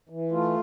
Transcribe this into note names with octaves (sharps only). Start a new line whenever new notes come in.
E3
A3 F4